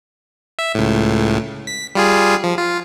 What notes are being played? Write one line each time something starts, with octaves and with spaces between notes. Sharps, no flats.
E5
C#2 A2
B6
G3 F4 G#4
F3
F4